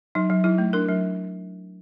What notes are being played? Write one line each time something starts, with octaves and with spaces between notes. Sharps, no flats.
F#3 D#4
F#3
F#3 E4
A3
D4 A#4
F#3